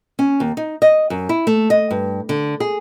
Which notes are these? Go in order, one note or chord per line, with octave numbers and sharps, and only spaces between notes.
C#4
D#2
D#4
D#5
F#2
E4
A3
D#5
G2
D3
G#4